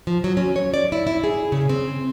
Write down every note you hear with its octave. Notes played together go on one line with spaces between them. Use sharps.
F3
F#3
C#4
C#5
D5
E4
E4
G#4
C#3
C4